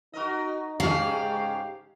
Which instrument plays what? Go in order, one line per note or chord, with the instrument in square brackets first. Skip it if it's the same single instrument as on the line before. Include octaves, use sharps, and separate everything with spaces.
[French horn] D#4 [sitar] F#4 A#4 D#5
[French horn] G#2 [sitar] C#3 G#3 C#4 [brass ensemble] G4 [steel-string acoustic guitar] F5